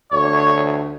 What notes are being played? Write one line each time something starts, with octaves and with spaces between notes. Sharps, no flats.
D2 C#5